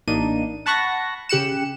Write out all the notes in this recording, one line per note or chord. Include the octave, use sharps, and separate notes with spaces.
A1 A#3 D4 D#4 D#7
F#5 A5 B5 C#6 F#6 A#6
C#3 G4 F#6 C#7 E7